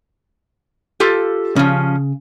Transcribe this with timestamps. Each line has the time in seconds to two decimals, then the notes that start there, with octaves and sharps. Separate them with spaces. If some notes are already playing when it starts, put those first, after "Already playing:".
1.00 F4 G4 A4
1.56 C#3 F3 C#4